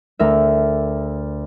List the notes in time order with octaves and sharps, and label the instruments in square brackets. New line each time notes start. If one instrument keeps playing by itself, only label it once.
[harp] D2 A#4 E5